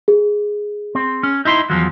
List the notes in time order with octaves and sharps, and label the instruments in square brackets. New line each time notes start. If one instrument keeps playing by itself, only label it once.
[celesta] G#4
[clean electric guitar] C4
C#4
D#4 E4 C6
E2 F3 F#3